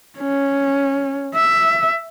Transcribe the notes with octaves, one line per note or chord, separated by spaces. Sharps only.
C#4
E5